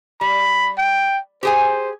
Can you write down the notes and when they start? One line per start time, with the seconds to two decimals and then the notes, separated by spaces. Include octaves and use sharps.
0.21 G3 B5
0.78 G5
1.43 G4 G#4 C5 G#5